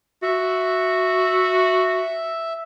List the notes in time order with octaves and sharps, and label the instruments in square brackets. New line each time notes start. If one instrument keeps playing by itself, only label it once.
[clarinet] F#4 [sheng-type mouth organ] E5